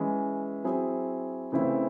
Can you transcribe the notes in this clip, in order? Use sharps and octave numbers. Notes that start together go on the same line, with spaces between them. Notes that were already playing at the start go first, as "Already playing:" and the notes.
Already playing: E3 G#3 C#4
F#3 C4 E4 G#4
C#3 E3 A3 C4 E4